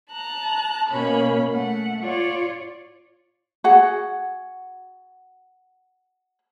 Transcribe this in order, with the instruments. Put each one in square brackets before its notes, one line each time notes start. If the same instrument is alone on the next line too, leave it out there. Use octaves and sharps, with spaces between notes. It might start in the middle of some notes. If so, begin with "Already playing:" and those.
[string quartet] A5 A#5 F#6
B2 A#3 C#4 B5
A3 F#5
F4 C#5 D5
[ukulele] F#4 G#4 F#5